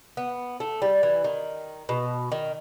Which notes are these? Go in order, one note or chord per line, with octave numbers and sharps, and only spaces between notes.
B3
A3
G3
E3
D#3
B2
D#3